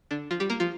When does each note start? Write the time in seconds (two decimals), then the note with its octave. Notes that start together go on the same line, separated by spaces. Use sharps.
0.11 D3 D4
0.31 F3 F4
0.40 G3 G4
0.50 A#3 A#4
0.60 F3 F4